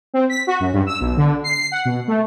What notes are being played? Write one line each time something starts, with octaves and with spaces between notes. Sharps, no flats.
C4
B6
F#4
F#2
G2
E6
B1
D3
C7
F#5
B2
A3